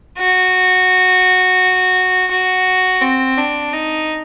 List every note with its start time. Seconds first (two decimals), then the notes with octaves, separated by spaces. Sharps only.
0.18 F#4
2.31 F#4
3.02 C4
3.38 D4
3.73 D#4